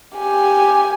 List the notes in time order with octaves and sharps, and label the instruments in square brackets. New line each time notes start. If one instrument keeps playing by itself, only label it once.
[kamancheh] G4 G#5